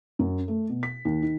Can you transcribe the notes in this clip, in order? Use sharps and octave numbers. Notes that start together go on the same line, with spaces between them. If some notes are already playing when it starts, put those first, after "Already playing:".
F#2
A3
B2
B6
D#2
D#3